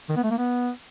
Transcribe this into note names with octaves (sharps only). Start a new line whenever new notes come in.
D#3
B3
A3
A#3
B3